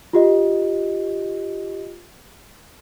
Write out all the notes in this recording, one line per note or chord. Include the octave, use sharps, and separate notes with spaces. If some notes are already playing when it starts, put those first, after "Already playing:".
F4 G4 D#5